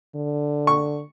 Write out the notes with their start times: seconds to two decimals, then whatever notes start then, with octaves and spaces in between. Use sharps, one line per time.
0.15 D3
0.67 C#6